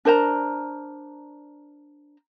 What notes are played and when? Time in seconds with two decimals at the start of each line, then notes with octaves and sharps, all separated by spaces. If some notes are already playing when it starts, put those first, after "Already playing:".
0.05 D4 A#4 C5 A#5